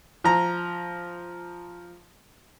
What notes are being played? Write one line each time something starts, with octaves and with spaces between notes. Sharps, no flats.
F3 A#5